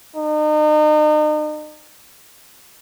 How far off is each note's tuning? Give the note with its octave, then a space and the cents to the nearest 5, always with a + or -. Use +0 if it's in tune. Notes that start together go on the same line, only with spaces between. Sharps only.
D#4 -40